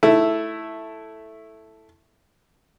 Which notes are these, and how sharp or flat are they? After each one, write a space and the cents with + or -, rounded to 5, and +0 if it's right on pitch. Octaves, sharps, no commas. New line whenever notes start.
A3 +0 E4 +0